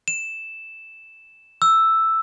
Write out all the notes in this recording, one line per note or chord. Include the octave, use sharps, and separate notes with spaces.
E7
E6